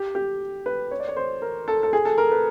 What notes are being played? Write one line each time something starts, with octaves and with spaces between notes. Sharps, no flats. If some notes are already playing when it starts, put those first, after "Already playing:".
Already playing: G4
G4
B4
C#5
D5
C#5
C5
A#4
A4
A4
G#4
A4
A#4
B4